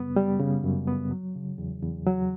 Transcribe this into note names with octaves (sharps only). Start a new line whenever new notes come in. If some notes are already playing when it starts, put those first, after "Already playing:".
Already playing: F#2 C#3 G3 B3
G3
C#3
F#2
B3
F#3
C#3
E2
E2
F#3